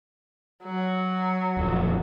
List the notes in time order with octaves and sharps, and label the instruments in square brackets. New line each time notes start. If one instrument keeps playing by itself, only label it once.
[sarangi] F#3
[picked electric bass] D#1 F2